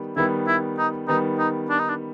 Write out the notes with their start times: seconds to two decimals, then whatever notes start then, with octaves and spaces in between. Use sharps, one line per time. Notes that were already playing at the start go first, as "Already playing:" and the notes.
Already playing: D#3 G3 B3
0.17 D#3 G3 B3 E4
0.47 E4
0.78 D#4
1.08 D#3 G3 B3 D#4
1.39 D#4
1.70 D4
1.79 D#4
1.89 D4